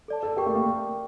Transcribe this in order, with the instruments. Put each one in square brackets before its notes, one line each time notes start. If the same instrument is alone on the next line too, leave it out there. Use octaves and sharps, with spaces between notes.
[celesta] A4 D5 A5
[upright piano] A4
[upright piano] G4 [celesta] A#4 D5 G5 C#6
[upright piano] A3
A#3